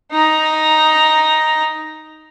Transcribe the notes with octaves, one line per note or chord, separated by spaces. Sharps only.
D#4 A#5